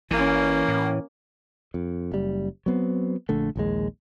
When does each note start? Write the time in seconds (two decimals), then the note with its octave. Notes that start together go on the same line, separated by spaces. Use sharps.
0.11 A1 E3 A#3 C#4
0.68 A2
1.74 F2
2.12 F#1 G3
2.66 F#3 B3 C4
3.29 A#1 D3 A3
3.56 A#1 D#2 G#3